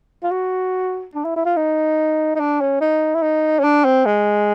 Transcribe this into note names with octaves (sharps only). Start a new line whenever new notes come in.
F4
F#4
D4
E4
E4
F4
D#4
D#4
D4
C#4
D#4
E4
D#4
C#4
D4
C4
G#3